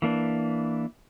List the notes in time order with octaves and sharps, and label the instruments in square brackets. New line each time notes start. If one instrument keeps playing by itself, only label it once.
[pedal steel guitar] E3 A#3 D4